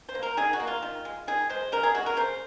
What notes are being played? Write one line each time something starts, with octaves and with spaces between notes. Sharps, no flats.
C5
A#3
A#4
D#3 G#4
F#4
A#3
F4
D#3
G#3
D#3 G#4
G#3 C5
C#3 A#4
G#4
G#3 F#4
A#4
C#3 C5